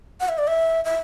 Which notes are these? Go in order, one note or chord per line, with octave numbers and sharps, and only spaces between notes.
F#5
E5
D5
E5
E5